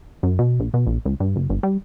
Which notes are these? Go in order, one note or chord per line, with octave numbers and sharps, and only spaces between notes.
F#2
B2
A#1
B2
A#1
C#2
G2
F#1
G1
G3